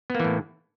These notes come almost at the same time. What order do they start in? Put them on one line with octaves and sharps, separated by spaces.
B3 A#3 E3 A2